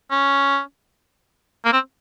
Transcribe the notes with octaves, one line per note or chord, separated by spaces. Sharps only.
C#4
A#3
C4